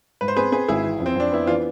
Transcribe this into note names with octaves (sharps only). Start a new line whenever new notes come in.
G#2 B4
C5
C4 G#4 B4
C4 G#4 B4
G#1 E4 G#4
E3
F2
C4
F2 D4
B3 E4
E3 D4 F4